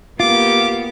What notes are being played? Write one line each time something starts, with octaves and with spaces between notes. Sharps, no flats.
A#3 B3 F4 G4 D6